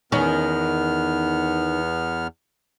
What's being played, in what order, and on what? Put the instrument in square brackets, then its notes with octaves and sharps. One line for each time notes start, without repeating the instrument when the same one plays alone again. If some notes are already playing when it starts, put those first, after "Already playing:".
[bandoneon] E2 B3 F6 [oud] D#3 C#4